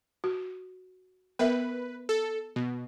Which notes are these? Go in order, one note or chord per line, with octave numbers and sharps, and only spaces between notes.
F#4
B3 A#4 B4 E5
A4
B2